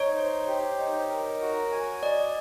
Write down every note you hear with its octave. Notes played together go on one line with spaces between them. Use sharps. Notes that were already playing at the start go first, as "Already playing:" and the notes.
Already playing: D#4 C#5
C5
G4
D#4
A#4
F#4
G#5
D5 D#5